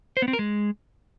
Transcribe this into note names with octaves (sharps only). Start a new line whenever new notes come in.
C5
B3
C4
A#4
G#3